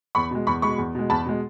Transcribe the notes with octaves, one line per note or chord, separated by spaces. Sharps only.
E2 B5 C#6
B2 G#3
E2 B5 C#6
B2 G#3 B5 C#6
E2
B2 G#3
E2 A5 B5
B2 G#3